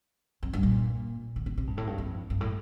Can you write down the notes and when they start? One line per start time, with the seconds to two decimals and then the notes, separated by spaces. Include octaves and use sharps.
0.43 F2
0.53 G2
0.63 A#2
1.36 D3
1.46 D3
1.58 C3
1.67 G2
1.77 A2
1.87 G2
1.98 F2
2.30 G2
2.41 A2